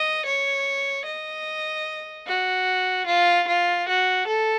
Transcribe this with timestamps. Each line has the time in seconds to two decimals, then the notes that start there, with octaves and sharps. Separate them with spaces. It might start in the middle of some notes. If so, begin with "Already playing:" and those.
Already playing: D#5
0.26 C#5
1.06 D#5
2.27 F#4
3.07 F4
3.48 F4
3.88 F#4
4.27 A4